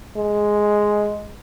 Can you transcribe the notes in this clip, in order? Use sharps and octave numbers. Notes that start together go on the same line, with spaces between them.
G#3